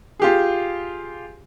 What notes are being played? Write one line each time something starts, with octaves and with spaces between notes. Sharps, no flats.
F4 G4 G#4